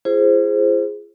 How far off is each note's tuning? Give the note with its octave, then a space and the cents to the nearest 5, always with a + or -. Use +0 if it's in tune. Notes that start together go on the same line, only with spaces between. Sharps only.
F4 -45 G#4 +0 C5 +0